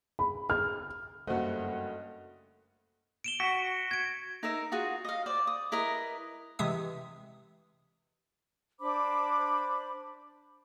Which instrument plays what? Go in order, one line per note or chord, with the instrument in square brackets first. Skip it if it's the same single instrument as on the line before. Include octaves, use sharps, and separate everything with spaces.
[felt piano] B5
F6
[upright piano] F#1 G2 [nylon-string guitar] A3 F#4 [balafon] A#3 C5 [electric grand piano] D#5 F#5
[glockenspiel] D7 E7 G7
[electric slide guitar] F#4 [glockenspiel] B6
[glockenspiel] G#6 D7
[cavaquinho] D#4 A#4 E5
F4 F#4 G#4 F#5
D#5 F5
C5 D5
D#6
E4 A#4 B4 D#5
[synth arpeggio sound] C3 E3 G#3 E5 D#6
[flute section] D4 C5 B5 D6